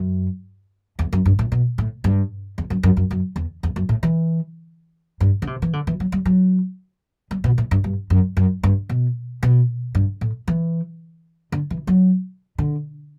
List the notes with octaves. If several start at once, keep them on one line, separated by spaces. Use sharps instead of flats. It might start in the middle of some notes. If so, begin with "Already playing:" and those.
Already playing: F#2
E2
F#2
G2
A2
B2
A2
G2
E2
F#2
F#2
F#2
F#2
E2
E2
F#2
A2
E3
G2
D3
C3
E3
D3
E3
F#3
G3
F#3
G3
B2
A2
G2
G2
F#2
F#2
G2
B2
B2
G2
A2
E3
D3
E3
F#3
D3